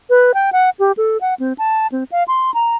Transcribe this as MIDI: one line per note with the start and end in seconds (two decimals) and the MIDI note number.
0.10 0.32 71
0.34 0.50 79
0.52 0.70 78
0.79 0.92 67
0.97 1.17 69
1.21 1.34 78
1.39 1.53 60
1.58 1.87 81
1.92 2.04 60
2.12 2.23 77
2.28 2.54 84
2.54 2.76 82